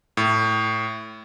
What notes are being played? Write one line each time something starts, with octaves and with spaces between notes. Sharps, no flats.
A2